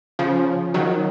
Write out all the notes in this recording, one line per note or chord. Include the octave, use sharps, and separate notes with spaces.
C#3 F3
D#3 F#3